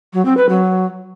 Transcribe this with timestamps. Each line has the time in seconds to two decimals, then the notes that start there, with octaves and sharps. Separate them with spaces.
0.13 F#3
0.25 C4
0.37 B4
0.49 F#3